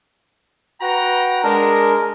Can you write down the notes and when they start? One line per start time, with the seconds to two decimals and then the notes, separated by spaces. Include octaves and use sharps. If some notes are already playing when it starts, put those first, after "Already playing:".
0.81 F#4 B4 G5 A#5
1.43 G#3 D4 A#4